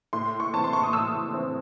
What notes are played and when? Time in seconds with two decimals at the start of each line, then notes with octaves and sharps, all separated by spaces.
0.13 A2 C6
0.40 C#6
0.54 E3 C4 A5
0.64 C6
0.73 C#6
0.83 D#6
0.93 A2 E6
1.33 E3 C4